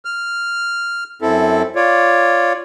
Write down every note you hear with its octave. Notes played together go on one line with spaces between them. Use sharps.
F6
F#2 C4 E4 A4
F4 C#5 D5